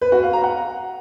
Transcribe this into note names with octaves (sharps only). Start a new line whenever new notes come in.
B4
F#4
F5
A#5
F#5